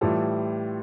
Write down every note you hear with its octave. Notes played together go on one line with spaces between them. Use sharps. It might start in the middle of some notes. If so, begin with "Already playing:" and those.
A2 E3 G3 F4 A4